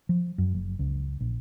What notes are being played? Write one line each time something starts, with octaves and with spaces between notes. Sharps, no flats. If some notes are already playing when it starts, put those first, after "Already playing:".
F3
F#2
F#1
C#2
A#1